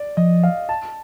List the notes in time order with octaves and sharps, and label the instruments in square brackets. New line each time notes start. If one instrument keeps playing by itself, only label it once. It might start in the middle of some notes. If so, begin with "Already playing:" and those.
Already playing: [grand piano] D5
[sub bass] F3 [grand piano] D#5
[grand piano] F5
A5